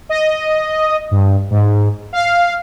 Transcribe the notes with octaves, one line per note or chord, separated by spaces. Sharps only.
D#5
G2
G#2
F5